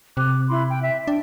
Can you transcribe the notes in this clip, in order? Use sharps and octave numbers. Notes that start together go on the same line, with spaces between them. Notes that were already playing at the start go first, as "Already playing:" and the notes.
C3 D6 F#6
E4 B5 C6
G5
E5
D4 G5